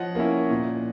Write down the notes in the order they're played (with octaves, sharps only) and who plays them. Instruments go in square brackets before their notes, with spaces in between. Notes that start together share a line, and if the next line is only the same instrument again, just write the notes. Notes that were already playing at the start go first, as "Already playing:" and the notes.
Already playing: [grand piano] F3 [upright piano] C#5 D#5 F#5
[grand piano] A#3 C#4 E4
A#2